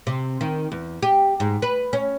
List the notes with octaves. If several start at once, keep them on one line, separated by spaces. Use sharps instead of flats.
C3
D#3
E2
G4
G#2
B4
C#4